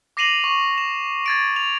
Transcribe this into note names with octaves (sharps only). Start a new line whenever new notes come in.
D6 A#6 C7 D#7 F7 F#7
C#6
E7
G#6 A6 D7
F7